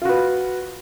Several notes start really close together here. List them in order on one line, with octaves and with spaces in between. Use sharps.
F4 F#4 B4